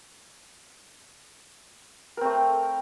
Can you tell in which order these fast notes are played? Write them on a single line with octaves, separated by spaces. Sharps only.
A#4 C4 A3